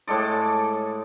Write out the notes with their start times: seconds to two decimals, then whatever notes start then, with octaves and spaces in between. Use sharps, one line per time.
0.07 A2 G#3 A4 D5